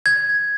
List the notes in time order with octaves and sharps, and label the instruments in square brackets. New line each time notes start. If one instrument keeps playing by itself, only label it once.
[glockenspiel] G#6